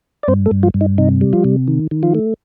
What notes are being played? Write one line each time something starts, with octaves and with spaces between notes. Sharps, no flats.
D5
G2 C4 C5
A3 A4
G2
F3 F4
G2
D#4
C3 D#4
G3
F3 F4
C3
D#3
D#3
F3 F4
A3